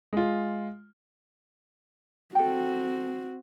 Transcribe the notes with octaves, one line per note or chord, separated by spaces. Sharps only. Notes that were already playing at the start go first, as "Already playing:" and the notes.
G#3 F4
C4 F#4 A4 G5